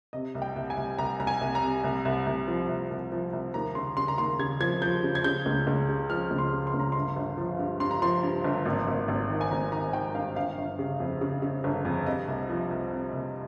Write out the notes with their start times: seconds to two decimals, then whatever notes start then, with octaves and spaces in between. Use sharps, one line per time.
0.13 C3 D#5
0.35 C2
0.42 G5
0.56 C2
0.70 G#5
0.77 C2
0.98 C2 A#5
1.19 C2 A#5
1.27 G#5
1.41 C2
1.55 A#5
1.62 C3
1.84 C2
2.05 C2
2.26 C2
2.47 F3
2.69 C2
2.91 C2
3.12 F3
3.33 C2
3.54 D#2 A#5
3.75 C#3 C6
3.96 C#3 C6
4.08 A#5
4.18 D#2 C6
4.39 C#3 G#6
4.61 F3 G#6
4.82 F3 G6
5.03 C#3
5.15 G#6
5.24 C#3 G6
5.46 C#2
5.67 C#2
5.89 C#3
6.10 F3 F6
6.31 C#2
6.38 C6
6.52 C#3
6.67 C6
6.74 C#2
6.79 A#5
6.92 G1 C6
7.16 G1
7.38 F3
7.59 G2
7.80 G2 C6
7.91 A#5
8.02 F3 C6
8.23 G2
8.44 G1
8.65 G#1
8.87 G#1
9.08 G#1
9.29 D#3
9.41 G#5
9.51 G#1 A#5
9.72 D#3 A#5
9.93 D#3 G5
10.14 G2 F5
10.36 G1 F5
10.58 G1
10.79 C#3
11.00 F2
11.21 C#3
11.42 C#3
11.64 G1
11.85 F2
12.06 C3 D#5
12.28 C2
12.49 F3
12.71 C2
12.92 C3
13.13 C2